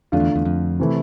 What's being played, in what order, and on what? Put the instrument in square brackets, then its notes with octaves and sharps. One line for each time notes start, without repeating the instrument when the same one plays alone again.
[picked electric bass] F2 [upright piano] D3 A3 D4 F4
[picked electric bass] E2
E2
F2
[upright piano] C3 E3 A3 E4